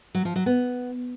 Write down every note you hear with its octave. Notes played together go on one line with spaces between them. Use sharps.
F#3
F3
F#3
B3